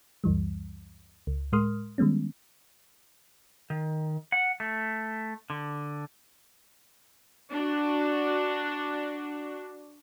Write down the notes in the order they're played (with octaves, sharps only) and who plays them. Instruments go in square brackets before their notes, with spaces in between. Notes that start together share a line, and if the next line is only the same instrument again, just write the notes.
[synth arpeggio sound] C#2 F#2 E3 G3
C#2
A2 G#3 A#4 C6 D#6 F6
D#3 G3 G#3 B3 C#4
[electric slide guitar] D#3
F#5
A3
D3
[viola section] D4 F#4